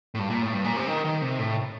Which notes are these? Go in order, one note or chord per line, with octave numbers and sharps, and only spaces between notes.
A2
G2
A#2
A2
G2
A#2
C3
D#3
D#3
C3
A2